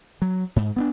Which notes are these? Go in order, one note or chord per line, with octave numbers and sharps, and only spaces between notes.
F#3
G#2
B3 C4 D4